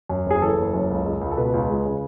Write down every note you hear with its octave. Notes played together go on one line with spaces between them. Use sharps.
F#2
F#1 G#4
E3 A4
F#1
F#2
C#2
G#3
C#2
A4
B2 B4
C#2
G#3
C#3